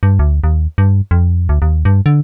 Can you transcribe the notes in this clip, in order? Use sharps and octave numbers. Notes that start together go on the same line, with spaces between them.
G2
D2
D#2
G2
F2
D2
D#2
G2
D3